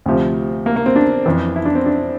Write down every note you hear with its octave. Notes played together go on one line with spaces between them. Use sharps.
D2 C3 F3
A#3
A#3
C4
D4
F2 E3
E4
D4
C4
D4